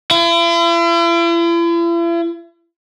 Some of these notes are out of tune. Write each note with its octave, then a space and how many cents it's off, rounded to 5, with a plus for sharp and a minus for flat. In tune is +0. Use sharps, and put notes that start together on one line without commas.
E4 +45